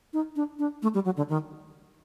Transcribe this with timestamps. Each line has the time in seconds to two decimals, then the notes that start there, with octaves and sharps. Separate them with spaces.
0.13 D#4
0.36 D4
0.59 D4
0.82 A3
0.94 G3
1.05 F#3
1.17 D3
1.29 D#3